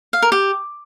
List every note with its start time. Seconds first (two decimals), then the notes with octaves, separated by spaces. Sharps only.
0.13 F5
0.22 A#4
0.32 G4